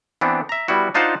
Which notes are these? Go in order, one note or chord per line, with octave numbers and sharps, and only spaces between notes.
E3 B3 C4 D4
E5 A#5
G3 B3 E4 F#4
D4 D#4 F4 C5 F#5 A5